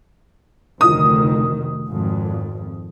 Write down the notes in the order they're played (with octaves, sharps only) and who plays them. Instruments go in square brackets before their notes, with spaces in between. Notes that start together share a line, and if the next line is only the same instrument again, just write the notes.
[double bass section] F1 D2 D#3 [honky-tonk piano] D#6
[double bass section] G#1 F2